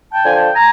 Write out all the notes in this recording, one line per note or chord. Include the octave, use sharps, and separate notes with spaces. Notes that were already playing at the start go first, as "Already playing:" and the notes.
G5 A5
D3 F3 G#5
G5 A5
G#5 A#5